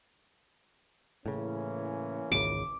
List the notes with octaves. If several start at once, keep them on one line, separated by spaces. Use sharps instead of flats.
A2 C#3 E3 A#3 C#4
G#1 C#2 C#3 D6